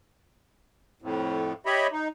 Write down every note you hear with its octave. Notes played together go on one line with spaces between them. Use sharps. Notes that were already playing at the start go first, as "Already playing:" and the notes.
F2 A2
G4 C#5 D#5 E5 B5
D#4